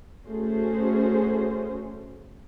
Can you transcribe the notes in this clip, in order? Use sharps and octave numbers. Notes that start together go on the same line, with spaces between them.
A3 C#4 F#4 G#4 C5